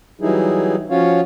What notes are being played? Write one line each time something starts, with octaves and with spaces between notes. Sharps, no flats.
E3 F#3 G3 D#4 E4 G#4
F3 C#4 F4 F#4 C#5 F5